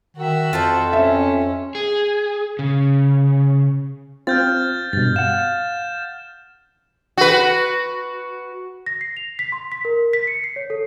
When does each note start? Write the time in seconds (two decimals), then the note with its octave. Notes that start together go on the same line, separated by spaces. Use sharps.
0.17 D#3 F#4 E5
0.53 F2 F4 A4 C5
0.93 C#4 E5
1.75 G#4
2.59 C#3
4.27 C4 F4 F6 G6 A6
4.93 G2 B2 A6
5.16 F5 F#5 E7
7.18 F#4 B4
8.86 A#6
9.01 C7
9.17 F7
9.39 B6
9.52 C6
9.72 B6
9.85 A#4
10.13 B6
10.27 C#7
10.44 C7
10.56 C#5
10.70 A4